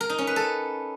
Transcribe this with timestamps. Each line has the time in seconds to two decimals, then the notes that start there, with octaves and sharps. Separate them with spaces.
0.01 A#4
0.09 D#4
0.18 C#4
0.27 B4
0.36 A4